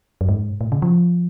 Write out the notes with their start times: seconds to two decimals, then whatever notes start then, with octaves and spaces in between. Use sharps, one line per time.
0.21 F#2
0.29 G#2
0.61 A2
0.72 C#3
0.82 F3